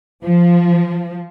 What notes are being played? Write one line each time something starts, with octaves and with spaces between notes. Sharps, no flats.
F3